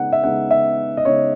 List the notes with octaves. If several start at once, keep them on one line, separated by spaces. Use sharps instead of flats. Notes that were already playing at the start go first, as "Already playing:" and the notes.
Already playing: C#3 G#3 B3 D#4 F#5
E5
C#3 G#3 B3 D#4 F#5
E5
D#5
C#3 G#3 B3 D#4 C#5